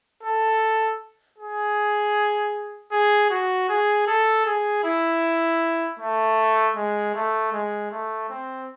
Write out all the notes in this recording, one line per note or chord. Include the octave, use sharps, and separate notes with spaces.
A4
G#4
G#4
F#4
G#4
A4
G#4
E4
A3
G#3
A3
G#3
A3
C4